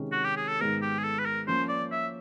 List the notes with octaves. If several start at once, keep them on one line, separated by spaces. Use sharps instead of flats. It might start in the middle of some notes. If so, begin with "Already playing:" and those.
Already playing: C3 D#3 G#3 C#4
F#4
G4
G#4
A4
G#2 D#3 G#3 B3 A#4
G4
G#4
A4
B4
A#4
F3 A#3 C#4 C5
D5
E5